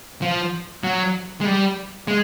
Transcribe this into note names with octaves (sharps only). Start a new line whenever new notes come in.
F3
F#3
G#3
G3
G#3